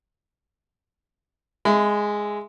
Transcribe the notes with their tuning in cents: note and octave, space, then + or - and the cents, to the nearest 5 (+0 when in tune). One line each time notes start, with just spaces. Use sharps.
G#3 +0 E5 +0 C6 -45